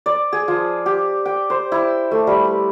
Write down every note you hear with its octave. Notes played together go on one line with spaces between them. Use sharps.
D5
G#4
F3
G4
G5
C5
E4
A3
G3
B4